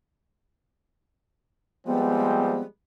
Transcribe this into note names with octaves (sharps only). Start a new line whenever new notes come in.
F3 G3 G#3 B3 C4